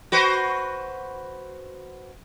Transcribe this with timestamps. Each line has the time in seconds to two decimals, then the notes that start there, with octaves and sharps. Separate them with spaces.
0.12 F#4 B4 C5